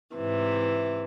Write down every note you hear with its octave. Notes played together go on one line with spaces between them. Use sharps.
G#2 C3 E3